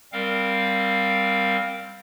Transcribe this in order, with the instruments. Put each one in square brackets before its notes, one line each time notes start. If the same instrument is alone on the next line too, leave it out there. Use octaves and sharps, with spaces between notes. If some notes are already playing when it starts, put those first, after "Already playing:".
[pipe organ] G3 C4 A#4 F5